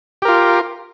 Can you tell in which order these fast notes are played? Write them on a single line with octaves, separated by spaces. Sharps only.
G4 A#4 F4